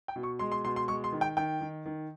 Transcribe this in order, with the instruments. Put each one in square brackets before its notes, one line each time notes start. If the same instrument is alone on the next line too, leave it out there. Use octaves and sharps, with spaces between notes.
[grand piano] G5
[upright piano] B2
[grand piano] C#6
[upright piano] G#3 [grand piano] C6
[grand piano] C6
[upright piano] B2 [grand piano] C6
[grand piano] C6
[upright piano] G#3 [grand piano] C#6
[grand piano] C6
[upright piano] D#3
[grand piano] G5
[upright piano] D#3 [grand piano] G5
[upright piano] D#3
D#3